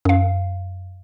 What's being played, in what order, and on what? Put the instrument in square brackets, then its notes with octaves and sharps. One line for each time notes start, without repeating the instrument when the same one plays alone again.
[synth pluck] F#2 F5